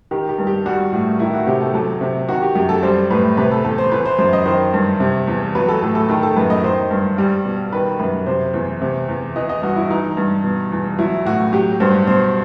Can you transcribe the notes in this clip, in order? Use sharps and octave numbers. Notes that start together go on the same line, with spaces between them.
D#3 G4
G4
G2
G4
G3 F#4
A2
D#3 E4
F#4
C3 G4
A4
F#3 A4
C3
D#3 F#4
G4
F#2 G4
A4
G3 C5
A2 B4
C3 B4
A4
E2 A4
C5
E3 B4
C5
F#2 C5
D#5
D#3 C5
G2
C3
E2
F#3 B4
A4
A2 A4
A4
D#3 A4
A4
F#2 B4
D#5
D#3 C5
G2
G3
B2
D#3 B4
F#2 B4
C3 C5
E2
C3
E2
E3 D#5
D#5
G2 F#4
E4
E3 D#4
G2
B2
E2
F#3 E4
A2 F#4
F#3 G4
G2 C5
B2 C5